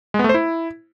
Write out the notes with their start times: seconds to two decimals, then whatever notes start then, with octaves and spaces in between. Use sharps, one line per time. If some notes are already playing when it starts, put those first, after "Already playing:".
0.14 G#3
0.19 B3
0.24 A3
0.29 C5
0.34 E4